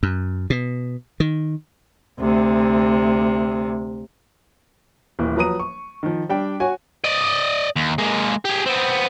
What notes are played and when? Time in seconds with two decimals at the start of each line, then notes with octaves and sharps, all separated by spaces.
0.03 F#2
0.50 B2
1.20 D#3
2.19 D2 C3
5.19 D#1 E3
5.36 F3 F#3 B4 A#5 D#6 D#7
5.60 C#6
6.03 D#3 F3
6.29 G3 D4 G5
6.60 F#4 C#5 G#5
7.04 D5 D#5
7.76 D#2
7.98 G#3 A#3
8.45 G4 G#4
8.66 B3 C4